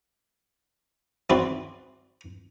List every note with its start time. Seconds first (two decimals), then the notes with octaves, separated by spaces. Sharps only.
1.30 E3 C4 F#4 B4 D5